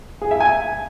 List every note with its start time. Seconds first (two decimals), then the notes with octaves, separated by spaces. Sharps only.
0.22 G#4
0.31 E5
0.40 G#5